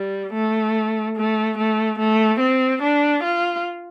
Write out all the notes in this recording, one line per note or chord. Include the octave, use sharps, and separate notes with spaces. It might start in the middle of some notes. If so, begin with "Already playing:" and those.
Already playing: G3
A3
A3
A3
A3
C4
D4
F4